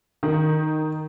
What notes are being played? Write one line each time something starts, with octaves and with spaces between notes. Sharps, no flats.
D#3